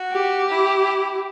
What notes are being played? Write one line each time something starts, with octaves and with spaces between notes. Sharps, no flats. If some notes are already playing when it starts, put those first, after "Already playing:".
Already playing: F#4
G4
E4